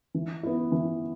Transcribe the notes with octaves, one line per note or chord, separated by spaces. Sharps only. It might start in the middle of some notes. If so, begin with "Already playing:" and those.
E3
B3 E4
E3